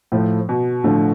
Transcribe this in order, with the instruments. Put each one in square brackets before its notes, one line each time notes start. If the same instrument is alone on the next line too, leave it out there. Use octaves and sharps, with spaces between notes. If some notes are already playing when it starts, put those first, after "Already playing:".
[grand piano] A2 F3 A3
[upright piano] B2
[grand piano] A2 F3 A3 [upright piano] D3